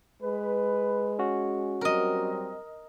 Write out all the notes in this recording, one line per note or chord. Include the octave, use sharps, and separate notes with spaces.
G#3 B4
C#4 F#4
F#3 G3 C4 A#4 D#5